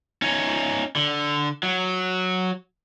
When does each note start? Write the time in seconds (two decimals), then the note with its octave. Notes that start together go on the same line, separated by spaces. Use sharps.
0.22 C#4 D#4
0.96 D3
1.63 F#3